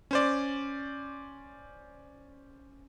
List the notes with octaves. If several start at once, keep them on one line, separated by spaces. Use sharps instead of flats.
C#4 C5 D5